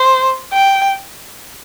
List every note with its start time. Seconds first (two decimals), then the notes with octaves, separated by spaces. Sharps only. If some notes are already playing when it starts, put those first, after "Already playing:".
Already playing: C5
0.53 G5